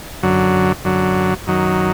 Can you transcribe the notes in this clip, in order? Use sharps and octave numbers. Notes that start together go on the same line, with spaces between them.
F#2 D3 F#3
F#2 D3 F#3
F#2 D#3 F#3